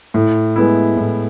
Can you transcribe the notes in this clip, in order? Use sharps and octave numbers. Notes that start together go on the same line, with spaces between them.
A2
G#3 B3 E4
A2